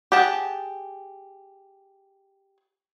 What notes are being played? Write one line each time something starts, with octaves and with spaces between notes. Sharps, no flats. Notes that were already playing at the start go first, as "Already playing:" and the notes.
G4 G#4 F#5 A5